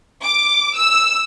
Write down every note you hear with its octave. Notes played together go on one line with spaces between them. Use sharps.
D6
E6